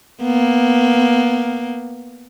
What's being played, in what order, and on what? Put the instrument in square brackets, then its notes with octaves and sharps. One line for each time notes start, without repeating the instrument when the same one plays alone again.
[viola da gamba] A#3 B3